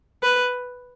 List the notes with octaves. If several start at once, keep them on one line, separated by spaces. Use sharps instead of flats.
B4